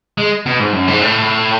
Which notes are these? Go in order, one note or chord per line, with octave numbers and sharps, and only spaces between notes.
G#3
B2
G#2
F#2
G#2
A2